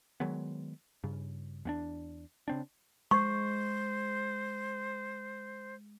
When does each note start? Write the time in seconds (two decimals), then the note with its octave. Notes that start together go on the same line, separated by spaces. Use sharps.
0.20 D#3 F#3 G#3 B3
1.04 G2 C#3
1.65 E2 B3 D4
2.48 C#3 C4 D4
3.11 G#3 C5 C#6